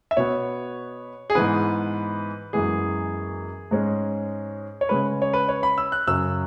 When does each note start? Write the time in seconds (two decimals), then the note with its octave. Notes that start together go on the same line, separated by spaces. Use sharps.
0.11 E5
0.17 B2 B3 C#5
1.30 G#4
1.35 G#2 E3 B3 B4
2.53 F#2 E3 G#3 B3 G#4
3.71 G#2 G#3 C#4
4.81 C#5
4.89 C#3 G#3 C#4 B4
5.22 C#5
5.33 B4
5.49 C#5
5.63 B5
5.78 E6
5.92 F#6
6.07 F#2 C#3 F#3 C#4 E6